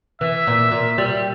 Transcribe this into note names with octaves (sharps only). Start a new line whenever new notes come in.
E3 E5
A#2
A#2
G3